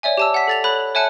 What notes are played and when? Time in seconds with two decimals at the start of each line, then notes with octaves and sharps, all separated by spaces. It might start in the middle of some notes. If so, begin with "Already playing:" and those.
0.03 C#5 D5 E5 G#5
0.17 G4 A5 E6
0.34 F#5 B6
0.48 A4 A6 F7
0.64 A4 C#5 B5 F#6 F#7
0.95 C#5 E5 G#5 A5 F#6 C#7